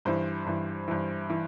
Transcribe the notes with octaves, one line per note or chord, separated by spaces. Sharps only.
G2 E3 C5
G2 E3
G2 E3
E3